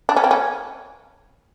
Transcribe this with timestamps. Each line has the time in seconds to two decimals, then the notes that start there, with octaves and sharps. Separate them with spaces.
0.09 D4
0.16 C#4
0.24 C4
0.31 C#4